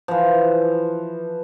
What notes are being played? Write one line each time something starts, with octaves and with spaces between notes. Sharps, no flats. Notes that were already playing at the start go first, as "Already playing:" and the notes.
E3 F3